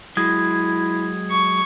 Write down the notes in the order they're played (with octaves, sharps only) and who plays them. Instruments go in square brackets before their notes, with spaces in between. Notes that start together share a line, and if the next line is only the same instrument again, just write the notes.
[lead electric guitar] F#3 G#3 [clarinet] E4 [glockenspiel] D#6 G#6
[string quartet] C#6